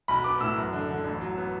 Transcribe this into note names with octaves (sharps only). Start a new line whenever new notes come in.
B1 B5
B3 D6
A2 E6
F#2
D3
D3
A1
F#3
B3